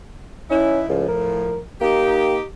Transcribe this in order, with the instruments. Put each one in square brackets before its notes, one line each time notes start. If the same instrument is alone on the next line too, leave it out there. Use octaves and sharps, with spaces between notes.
[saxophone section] E3 D#4 E4 [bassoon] C#4
[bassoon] C#2 [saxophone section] A2 F3
[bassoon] A#4
[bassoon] A#3 [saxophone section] D#4 G4